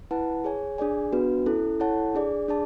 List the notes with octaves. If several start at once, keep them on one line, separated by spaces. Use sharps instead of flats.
E4 B4 F#5 A5
G#4 C#5 G#5
D4 G#4 D5 G#5
B3 D4 F#4 B4
C#4 E4 A4
E4 A4 C#5 F#5 A5
D4 G#4 D5
D4 G#4 D5 A5